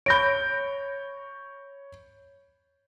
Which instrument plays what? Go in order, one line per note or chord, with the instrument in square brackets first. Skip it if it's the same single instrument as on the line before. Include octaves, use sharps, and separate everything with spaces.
[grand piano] C#5 G6 [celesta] B5 A#6 D7